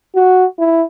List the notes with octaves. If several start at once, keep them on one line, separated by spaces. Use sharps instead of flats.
F#4
E4